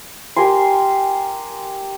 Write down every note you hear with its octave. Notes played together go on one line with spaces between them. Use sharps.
G4 A#4 G#5 C6